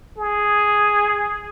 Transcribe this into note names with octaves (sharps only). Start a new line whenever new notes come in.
G#4